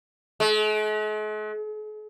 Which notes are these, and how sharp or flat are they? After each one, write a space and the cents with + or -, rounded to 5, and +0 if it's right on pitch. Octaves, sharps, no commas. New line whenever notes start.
G#3 +45